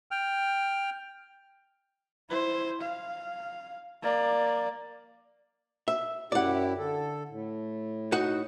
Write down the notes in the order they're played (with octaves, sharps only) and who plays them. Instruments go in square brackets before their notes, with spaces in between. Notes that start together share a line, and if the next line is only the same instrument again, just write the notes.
[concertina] G5 F6
[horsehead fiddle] E4 C5
F5
A#3 D5
[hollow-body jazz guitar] E5
[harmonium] F#2 E4 G4 [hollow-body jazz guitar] D5 F#5
[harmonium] D3 A4
A2
[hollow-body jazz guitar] D#4 F#4 F#5